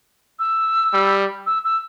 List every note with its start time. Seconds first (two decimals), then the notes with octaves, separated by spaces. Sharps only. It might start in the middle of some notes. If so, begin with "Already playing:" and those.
0.39 E6
0.93 G3
1.47 E6
1.64 E6